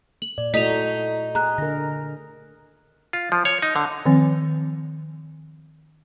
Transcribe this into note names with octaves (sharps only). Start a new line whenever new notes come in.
F#7
A#2 D5
A3 D#4 E4 F#4 A4 A#5 B6 F7
G#4 A#5 F#6
D3 A#4 A#6
F4
F3
C#5
D#4
D3
D#3 F3 C4